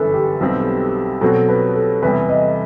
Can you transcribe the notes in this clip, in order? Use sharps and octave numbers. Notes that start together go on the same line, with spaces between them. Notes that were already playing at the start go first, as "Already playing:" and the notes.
Already playing: G1 F#2 E3 A4 B4
G4
B1 B2 G3 C4
B2 F#3 C4 F#4 A4
B4
A4
E2 C3 E3 G3 B4
D#5